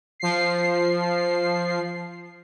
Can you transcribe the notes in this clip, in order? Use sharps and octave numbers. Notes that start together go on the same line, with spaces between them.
F3 C7